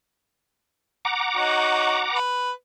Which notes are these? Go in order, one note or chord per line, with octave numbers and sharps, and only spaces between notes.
F#5 A#5 D6
D#4 F#4 C#5
B4